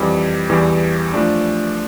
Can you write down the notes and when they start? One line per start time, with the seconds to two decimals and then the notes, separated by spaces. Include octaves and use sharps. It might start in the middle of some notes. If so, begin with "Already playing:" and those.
Already playing: F2 E3 G3
0.49 E2 E3 G3
1.14 F3 A3 D4